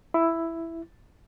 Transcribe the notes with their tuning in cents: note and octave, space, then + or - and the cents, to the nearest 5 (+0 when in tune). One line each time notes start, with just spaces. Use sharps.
E4 +5